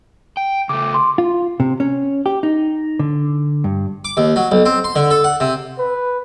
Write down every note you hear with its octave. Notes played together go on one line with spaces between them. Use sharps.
G5
C#3 A3 D6
C6
F4
C3
C#4
G4
D#4
D3
G2
D6
D#2
F#3
B1
C4
C6
D3
A4
F#5
C3
B4